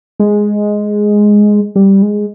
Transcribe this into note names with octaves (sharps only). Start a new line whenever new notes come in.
G#3
G3
G#3